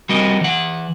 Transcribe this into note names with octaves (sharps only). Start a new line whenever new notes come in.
G3 C4 F#4 A#4 D#5
E3 F#5